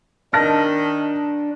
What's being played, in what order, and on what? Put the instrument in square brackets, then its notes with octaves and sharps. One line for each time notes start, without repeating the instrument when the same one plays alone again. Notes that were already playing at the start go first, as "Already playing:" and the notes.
[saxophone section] D#3 [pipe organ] D4 [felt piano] A5 F6 A#6